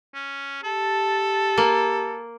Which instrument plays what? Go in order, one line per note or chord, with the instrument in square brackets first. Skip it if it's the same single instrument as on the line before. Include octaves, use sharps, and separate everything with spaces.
[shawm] C#4
[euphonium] G4 [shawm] A4 [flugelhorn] A5
[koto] A#3